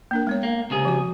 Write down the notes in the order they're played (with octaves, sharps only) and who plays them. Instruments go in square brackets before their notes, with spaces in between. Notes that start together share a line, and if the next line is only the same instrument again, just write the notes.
[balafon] A#3 D4 A#4
G#3 B3 C#5
[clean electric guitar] A#3
C#2 C3 G#4
[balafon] F3 F#4